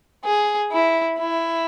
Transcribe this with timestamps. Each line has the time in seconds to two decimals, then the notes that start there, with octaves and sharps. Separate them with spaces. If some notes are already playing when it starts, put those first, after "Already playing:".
0.25 G#4
0.72 E4
1.18 E4